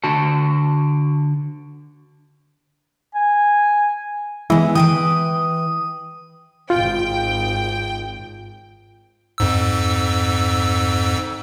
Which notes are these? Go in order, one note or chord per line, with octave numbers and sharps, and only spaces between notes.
D3 F#4 A5
G#5
E3 G#3 B3
E3 B4 G5 D#6
G#1 F4 G5
F2 G#2 E6